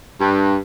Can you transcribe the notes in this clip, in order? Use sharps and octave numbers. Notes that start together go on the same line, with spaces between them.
G2